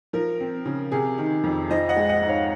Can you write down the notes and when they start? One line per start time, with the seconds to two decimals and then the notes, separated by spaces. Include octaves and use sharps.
0.13 F3 A#4
0.40 C4
0.65 C#3
0.92 C3 G#4
1.18 D#3
1.44 F2
1.70 F3 C5 D#5
1.89 D#5 F#5
1.96 G#3
2.09 D#5 F#5
2.22 G#2
2.28 C#5 F5